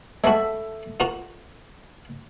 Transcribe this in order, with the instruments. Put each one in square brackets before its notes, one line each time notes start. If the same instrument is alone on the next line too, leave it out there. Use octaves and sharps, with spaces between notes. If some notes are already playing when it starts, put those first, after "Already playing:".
[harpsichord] G#3 A3 F#4 [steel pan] A4 E5
[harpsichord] F4 F#4 A#4